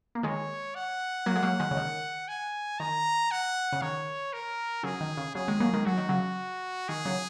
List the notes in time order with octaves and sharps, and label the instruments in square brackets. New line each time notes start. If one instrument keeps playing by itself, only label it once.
[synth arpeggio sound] A#3
[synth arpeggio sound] D#3 G#3 [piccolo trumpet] C#5
[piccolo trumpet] F#5
[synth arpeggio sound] F#3 A#3
G#3
F#3 A#3
D#3 G#3
C#3
D#3
[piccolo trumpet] G#5
[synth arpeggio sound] D#3 [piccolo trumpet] A#5
[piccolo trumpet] F#5
[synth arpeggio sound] C#3
[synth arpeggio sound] D#3 [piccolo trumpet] C#5
[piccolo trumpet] A#4
[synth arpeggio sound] C#3 F#3 [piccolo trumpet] G#4
[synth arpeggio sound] D#3
C#3
[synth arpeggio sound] C#3 F#3 [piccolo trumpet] G#4
[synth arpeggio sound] D#3 G#3
F#3 A#3
D#3 G#3
[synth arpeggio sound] F#3 [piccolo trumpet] F#4
[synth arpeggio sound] D#3
C#3 F#3
[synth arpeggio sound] D#3 [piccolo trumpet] G#4
[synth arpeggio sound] C#3 F#3